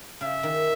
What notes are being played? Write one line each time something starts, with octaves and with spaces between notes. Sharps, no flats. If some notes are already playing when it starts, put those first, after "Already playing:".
C#3 E5
D#3